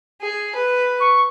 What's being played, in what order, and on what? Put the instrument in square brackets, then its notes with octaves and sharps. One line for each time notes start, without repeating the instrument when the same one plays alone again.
[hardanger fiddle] G#4
B4
[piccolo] C#6